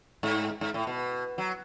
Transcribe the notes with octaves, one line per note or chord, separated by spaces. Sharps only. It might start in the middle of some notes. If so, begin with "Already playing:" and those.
G#2
G#2
A2
B2
F#3